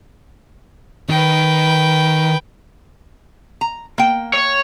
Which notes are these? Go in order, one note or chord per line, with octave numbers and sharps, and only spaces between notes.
D#3 B4 G5
A#5
A#3 G5
C#5